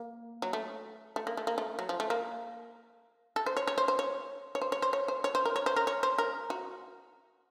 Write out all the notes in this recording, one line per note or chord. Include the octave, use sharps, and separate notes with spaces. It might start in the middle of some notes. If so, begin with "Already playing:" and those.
Already playing: A#3
F#3
A3
A3
A#3
A3
A#3
A3
F#3
F3
A3
A#3
A4
C5
C#5
C#5
C5
C5
C#5
C#5
C5
C#5
C5
C#5
C5
C#5
C5
A#4
C#5
C5
A#4
C#5
C5
A#4
F#4